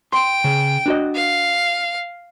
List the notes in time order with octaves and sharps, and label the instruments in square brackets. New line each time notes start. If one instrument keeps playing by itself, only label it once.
[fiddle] G5 [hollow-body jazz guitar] C6
[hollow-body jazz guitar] C#3
D4 F#4 D#5
[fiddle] F5